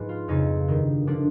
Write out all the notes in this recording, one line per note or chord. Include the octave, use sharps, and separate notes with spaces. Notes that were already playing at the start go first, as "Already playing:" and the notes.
Already playing: G#2 F3 B4
F4
F2 C#3 F3 D#4
G2 D#3
D3 F3 D4